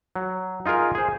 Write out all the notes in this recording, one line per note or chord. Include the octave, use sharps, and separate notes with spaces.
F#3
D#4 F4 G#4 A#4
G#4 C5